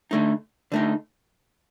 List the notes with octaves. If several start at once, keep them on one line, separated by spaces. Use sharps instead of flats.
D3 A3 D#4
D3 A3 D#4